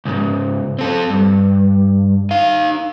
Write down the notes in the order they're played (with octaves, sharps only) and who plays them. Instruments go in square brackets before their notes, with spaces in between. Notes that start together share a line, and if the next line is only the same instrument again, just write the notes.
[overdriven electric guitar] C#2 G#2
C4 A4
G2
D#4 F5